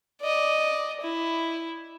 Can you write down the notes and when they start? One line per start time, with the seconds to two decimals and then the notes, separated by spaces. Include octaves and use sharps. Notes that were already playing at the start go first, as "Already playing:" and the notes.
0.21 D5 D#5
1.01 E4